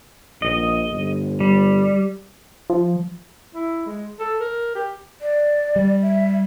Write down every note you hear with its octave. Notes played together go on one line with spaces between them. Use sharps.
A#1 D#5
G1
G3
F3
E4
G#3
A4
A#4
G4
D5
G3
E5